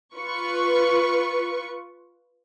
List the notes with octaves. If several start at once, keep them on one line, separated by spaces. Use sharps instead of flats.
F4 B4 C#6